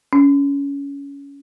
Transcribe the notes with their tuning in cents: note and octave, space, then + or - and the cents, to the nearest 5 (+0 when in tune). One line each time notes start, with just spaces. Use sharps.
C#4 +20